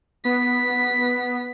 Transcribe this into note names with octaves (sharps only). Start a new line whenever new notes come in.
B3 B6